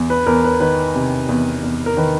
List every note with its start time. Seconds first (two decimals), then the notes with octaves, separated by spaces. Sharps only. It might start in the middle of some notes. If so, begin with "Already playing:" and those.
Already playing: E2
0.10 B4
0.26 E2 A#4
0.44 B4
0.60 D#3 B4
0.95 C3
1.29 E2
1.63 E2
1.86 A#4
1.97 D#3 B4